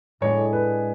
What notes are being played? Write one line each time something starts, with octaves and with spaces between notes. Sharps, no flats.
A2 G#3 D4 C#5
B4